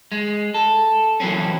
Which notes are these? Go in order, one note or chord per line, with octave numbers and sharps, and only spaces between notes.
G#3
A4
E3 F#3 A#3 C4 C#4